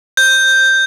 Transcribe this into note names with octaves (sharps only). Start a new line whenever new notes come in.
G6